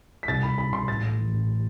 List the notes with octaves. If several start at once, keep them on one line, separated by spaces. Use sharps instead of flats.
B6
C2 A6
C2 B5
C2 B5
C2 C6
A1 A6
A2
E3
A1